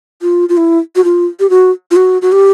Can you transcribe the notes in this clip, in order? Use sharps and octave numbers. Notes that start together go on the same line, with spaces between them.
F4
F4
E4
F#4
F4
G4
F#4
F4
F#4
F#4
G4